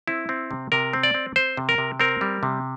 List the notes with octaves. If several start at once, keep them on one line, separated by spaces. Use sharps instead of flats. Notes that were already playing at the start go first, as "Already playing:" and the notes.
C4 E4
C4
C3
C3 A#4
C4
D5
C4
C4 C5
C3
A#4
C3
C4 A#4
G3
C3